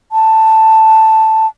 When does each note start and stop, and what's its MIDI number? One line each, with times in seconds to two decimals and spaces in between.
0.12 1.47 81